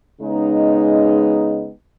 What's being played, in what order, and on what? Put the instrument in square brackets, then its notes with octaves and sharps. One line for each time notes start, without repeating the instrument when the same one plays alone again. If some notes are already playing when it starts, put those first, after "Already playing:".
[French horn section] C#3 G#3 B3 D#4